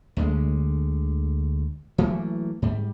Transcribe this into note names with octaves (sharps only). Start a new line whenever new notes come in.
D2 D3 G3 G#3
E3 F#3 A3 A#3
G#2 G3